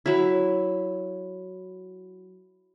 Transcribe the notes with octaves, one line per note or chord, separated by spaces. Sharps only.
F#3 E4